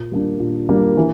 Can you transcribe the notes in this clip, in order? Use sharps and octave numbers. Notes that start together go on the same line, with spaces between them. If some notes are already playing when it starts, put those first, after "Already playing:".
Already playing: A#2
G3 A#3 D4
A#2
G3 A#3 D4
E3